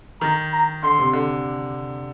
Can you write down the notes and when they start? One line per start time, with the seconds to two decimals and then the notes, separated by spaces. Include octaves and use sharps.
0.21 D#3 A#5
0.53 A#5
0.83 D3 C6
0.99 C3
1.13 D3